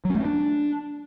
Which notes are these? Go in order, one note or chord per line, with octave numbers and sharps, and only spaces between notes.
F#3
C#4
A3
C#4
D4